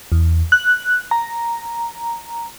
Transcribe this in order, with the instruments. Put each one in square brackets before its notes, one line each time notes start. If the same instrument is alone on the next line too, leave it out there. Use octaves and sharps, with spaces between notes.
[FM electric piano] E2
F#6
A#5